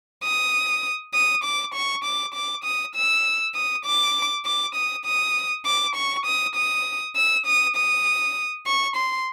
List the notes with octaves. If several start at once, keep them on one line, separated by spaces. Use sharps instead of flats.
D#6
D#6
D6
C#6
D6
D6
D#6
E6
D#6
D6
D6
D#6
D#6
D6
C#6
D#6
D#6
E6
D#6
D#6
C#6
C6